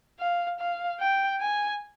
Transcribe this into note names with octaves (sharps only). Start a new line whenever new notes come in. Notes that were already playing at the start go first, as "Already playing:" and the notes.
F5
F5
G5
G#5